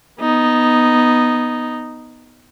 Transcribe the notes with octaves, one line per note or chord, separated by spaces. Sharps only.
B3 D#4